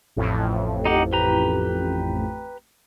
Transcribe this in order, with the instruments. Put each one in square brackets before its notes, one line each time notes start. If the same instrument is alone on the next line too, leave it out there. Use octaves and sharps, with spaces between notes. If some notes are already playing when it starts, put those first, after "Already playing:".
[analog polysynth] A1 F2 A2
[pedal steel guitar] D#4 G4 F#5
G4 B4 A#5